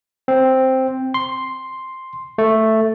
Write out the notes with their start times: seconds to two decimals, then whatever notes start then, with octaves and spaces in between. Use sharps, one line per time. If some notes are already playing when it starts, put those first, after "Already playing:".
0.28 C4
1.14 C6
2.38 A3